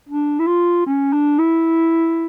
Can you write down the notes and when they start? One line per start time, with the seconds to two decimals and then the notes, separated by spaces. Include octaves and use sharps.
0.09 D4
0.40 E4
0.47 F4
0.86 C#4
1.13 D4
1.39 E4